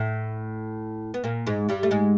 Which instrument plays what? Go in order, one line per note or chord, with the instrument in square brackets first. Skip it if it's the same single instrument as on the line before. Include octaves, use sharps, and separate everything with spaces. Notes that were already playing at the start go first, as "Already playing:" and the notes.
Already playing: [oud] A2 A3
B3
A#2 A#3
G#2 G#3
G2 G3
A3
G#2 G#3